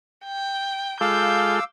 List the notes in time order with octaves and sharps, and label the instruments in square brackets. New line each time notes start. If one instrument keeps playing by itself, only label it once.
[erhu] G5
[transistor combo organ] G#3 F4 A4 [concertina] F5 D6 E6 [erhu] G6